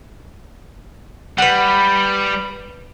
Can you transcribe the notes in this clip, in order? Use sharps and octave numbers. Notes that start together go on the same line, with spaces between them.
G3 B4 F#5